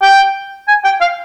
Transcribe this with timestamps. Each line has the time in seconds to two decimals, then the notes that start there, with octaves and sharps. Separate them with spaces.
0.02 G5
0.68 G#5
0.84 G5
1.01 F5